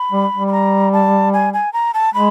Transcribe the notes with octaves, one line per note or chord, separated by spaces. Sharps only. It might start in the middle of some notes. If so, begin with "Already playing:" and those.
Already playing: B5
G3
G3
B5
A#5
A5
G#5
G#5
A#5
A5
G#3 B5